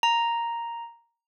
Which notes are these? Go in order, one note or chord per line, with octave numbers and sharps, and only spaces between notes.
A#5